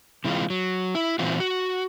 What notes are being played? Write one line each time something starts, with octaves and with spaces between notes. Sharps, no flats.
C3 E3 G#3 F4
F#3
E4
A#2 E3 C4 F4 F#4
F#4